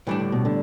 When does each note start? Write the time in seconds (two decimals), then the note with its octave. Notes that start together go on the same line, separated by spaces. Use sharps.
0.07 A2 E3 G3 D4
0.20 D3
0.32 B2
0.45 D3